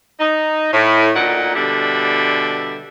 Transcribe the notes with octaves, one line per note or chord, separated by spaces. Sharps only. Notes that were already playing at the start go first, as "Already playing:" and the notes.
D#4
A2
D2 A#2 D#4 F#5
B2 D3 G3 E5